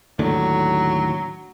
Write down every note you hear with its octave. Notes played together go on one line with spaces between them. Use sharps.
D#2 A2 D3 F#3